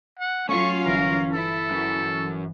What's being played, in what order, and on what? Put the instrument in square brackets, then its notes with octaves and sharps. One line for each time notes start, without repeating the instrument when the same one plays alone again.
[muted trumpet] F#5
[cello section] F#3 F4 F5 [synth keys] A3 [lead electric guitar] C#4 [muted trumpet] C#6
[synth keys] G1 E3 [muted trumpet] A#4
[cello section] E4 [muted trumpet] A4
[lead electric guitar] F#2